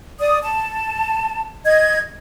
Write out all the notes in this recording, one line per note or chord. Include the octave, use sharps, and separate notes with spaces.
D5 D#6
A5
D#5 G#6